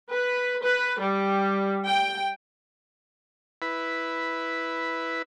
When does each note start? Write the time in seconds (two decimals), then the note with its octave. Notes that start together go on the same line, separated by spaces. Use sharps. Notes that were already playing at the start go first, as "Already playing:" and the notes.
0.11 B4
0.64 B4
0.99 G3
1.86 G5
3.62 E4 B4